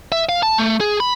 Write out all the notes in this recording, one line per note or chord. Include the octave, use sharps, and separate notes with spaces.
E5
F5
A5
A3
G#4
B5